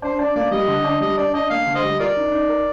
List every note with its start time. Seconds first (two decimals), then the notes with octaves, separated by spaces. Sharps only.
0.02 D4 C5
0.19 D4 D5
0.35 A#3 D5
0.51 G3 D#5
0.68 D3
0.84 D4
1.01 G3 D#5
1.17 D4 D5
1.34 D4 D#5
1.50 A#3 F5
1.66 D3
1.75 C5 D#5
1.82 G3
2.00 F4 A#4 D5
2.16 D#4
2.32 D#4
2.49 A#4